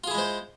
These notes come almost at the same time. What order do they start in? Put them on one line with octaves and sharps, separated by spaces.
F4 G#4 E4 G#3 C5